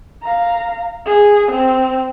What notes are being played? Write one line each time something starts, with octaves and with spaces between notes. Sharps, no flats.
F5 A#5
G#4
C4